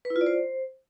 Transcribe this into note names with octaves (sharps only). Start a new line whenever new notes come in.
B4
E4
F4
D5
C5